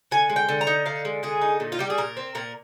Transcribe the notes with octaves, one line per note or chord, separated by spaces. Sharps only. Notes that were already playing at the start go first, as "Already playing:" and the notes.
D3 G#5
G#3
G5
D3
A#5
D#4
D3 F5
G#3
D3 G#4
D#4
A#2
F4
G3 G4
G#4
A#2 A#4
C4
A#2 A#4